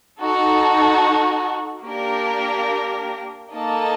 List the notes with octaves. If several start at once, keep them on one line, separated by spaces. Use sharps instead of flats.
D#4 F#4 A4
A#3 D4 G4 A#4
A#3 D#4 A4 D#5 A5